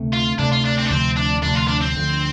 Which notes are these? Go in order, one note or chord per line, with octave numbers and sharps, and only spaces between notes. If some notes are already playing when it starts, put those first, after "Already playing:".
Already playing: D2 C3 A3
F4
D2 C3 A3 D4
F4
D4
C4
D4
D2 C3 F3 A3 C4
D4
D2 C3 F3 A3 D4
F4
D4
C4
D2 D3 F3